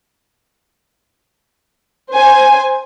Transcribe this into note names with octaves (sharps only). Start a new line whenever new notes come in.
C5 G#5